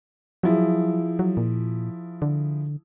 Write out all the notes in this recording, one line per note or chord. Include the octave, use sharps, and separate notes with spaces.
F3 F#3 E4 G#4
F#3
A#2
D3